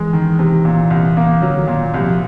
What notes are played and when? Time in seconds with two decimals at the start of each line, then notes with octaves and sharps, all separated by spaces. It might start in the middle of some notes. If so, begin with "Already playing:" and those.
Already playing: E3 G#3
0.13 D#3
0.39 C3
0.65 A#2
0.91 C2
1.17 A#3
1.42 D3 F#3
1.62 D#3
1.67 A#2
1.94 C2
2.00 F3